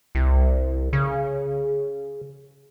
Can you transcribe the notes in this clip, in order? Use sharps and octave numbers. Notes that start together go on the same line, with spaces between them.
C2
C#3